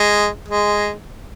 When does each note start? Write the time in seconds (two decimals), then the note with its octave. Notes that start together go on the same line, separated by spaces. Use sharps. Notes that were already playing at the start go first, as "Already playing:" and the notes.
Already playing: G#3
0.48 G#3